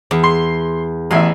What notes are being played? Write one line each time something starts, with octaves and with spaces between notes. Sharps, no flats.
E2
C6
A1 E2 E5 G#5 C6